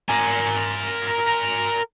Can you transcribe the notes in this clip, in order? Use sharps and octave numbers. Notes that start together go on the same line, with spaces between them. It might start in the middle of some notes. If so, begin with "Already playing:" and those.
A#4 G#5